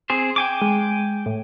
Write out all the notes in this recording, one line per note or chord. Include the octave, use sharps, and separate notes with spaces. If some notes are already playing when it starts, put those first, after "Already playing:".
C4 G#4 C5
G5 G#5 D6
G#3
A2